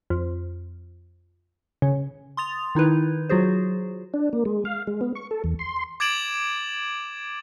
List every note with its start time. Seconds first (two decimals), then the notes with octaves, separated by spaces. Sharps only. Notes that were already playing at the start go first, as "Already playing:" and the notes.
0.10 F2
1.82 C#3
2.37 C6 D#6 A6 F7
2.75 D#3 D#4 E4 B4
3.29 F#3 F4 F#4 G#4 C5
4.14 D4
4.33 A#3
4.45 G#3
4.65 F5
4.87 G#3
5.01 B3
5.15 C#6
5.31 A4
5.44 E2
5.59 C6
6.00 D6 G#6 A6 D7 E7 F#7